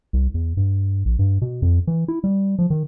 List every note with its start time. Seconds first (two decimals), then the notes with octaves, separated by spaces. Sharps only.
0.13 C2
0.34 E2
0.57 G2
1.05 A#1
1.19 G2
1.42 B2
1.62 F2
1.87 E3
2.08 E4
2.24 G3
2.59 F3
2.70 D#3